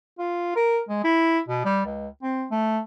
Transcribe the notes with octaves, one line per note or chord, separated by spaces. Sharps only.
F4
A#4
G#3
E4
B2
G3
C#2
C4
A3